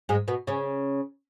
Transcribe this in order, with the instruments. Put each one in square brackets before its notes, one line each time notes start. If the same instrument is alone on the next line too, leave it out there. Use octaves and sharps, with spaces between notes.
[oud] G#2 G#3
B2 B3
C#3 C#4